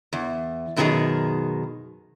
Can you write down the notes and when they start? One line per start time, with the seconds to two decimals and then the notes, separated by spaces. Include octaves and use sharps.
0.13 E2
0.76 F#2 B2 D#3 F#4 G#4 A#5